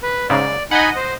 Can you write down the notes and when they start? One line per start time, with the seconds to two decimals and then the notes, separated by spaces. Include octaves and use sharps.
0.03 B4
0.30 G#2 C#3 D5
0.71 D#4 D#5 F#5 G#5 B5
0.96 C5